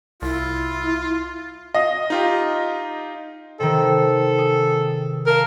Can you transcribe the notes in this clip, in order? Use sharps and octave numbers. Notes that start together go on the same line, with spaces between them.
C2 E4 F4
D#5 F5
D#4 F4 G4
C3 D#3 A4
G#4
A#4 F5 A5 F6